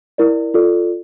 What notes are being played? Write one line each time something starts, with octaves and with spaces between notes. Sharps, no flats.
E4 A#4 D5
F4 A4 D5